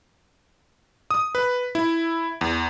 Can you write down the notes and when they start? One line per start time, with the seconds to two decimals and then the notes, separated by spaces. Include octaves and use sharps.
1.11 D#6
1.35 B4
1.75 E4
2.41 E2